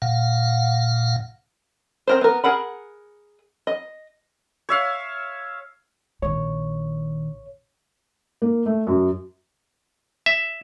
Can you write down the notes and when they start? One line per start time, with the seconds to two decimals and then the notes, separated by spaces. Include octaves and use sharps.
0.02 A#2 F5 F#5
2.07 C4 A#4 C5
2.21 B3 A#4
2.44 G#4 A#4 F#5 B5
3.67 D#5
4.69 C#5 E5 F5
6.22 A#1 D#3 C#5
8.42 A#3
8.66 A3
8.87 F#2
10.26 E5